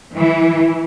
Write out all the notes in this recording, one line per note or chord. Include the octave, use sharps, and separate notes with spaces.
E3